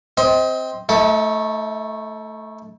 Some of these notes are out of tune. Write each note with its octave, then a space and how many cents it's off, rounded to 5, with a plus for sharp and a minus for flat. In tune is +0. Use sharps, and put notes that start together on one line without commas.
C4 +0 D#5 +30
A3 +0 D#4 +40